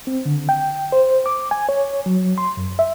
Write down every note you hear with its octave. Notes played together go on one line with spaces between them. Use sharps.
C4
D3
G5
C5
D6
G#5
C#5
F#3
C6
F#2
E5